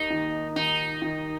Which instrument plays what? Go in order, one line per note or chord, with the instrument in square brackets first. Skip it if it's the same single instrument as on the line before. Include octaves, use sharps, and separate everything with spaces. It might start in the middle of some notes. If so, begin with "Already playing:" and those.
Already playing: [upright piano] D#2 [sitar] D#4
[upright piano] D#3
[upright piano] D#3 [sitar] D#4
[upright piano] D#3